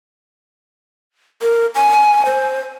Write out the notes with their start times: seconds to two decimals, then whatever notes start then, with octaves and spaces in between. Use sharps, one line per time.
1.42 A#4
1.75 G#5
2.26 C5